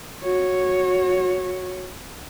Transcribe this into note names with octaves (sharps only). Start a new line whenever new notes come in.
F#4 C#5